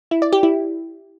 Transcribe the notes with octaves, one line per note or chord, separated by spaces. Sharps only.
E4
D5
G4
E4